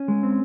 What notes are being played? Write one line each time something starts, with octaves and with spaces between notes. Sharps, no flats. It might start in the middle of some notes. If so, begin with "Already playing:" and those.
Already playing: C#4
G#3
C4